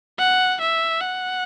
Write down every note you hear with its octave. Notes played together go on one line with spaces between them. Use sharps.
F#5
E5
F#5